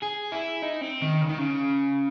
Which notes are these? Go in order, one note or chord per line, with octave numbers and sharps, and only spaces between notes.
G#4
E4
D#4
C4
D#3
C#3
D#3
C#3